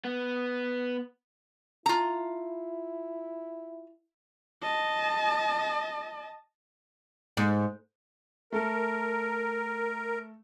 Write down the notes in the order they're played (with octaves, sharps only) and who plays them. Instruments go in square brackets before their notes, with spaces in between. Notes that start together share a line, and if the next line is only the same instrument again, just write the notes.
[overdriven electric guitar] B3
[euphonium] E4 [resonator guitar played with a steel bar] F4 A#5
[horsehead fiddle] D#5 A5
[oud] G#2
[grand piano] A3 A4 [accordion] A#4